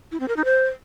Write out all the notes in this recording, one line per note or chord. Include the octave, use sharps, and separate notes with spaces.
E4
C4
A#4
D#4
C5